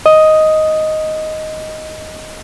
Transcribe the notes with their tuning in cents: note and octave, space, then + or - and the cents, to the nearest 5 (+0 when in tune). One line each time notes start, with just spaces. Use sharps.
D#5 +5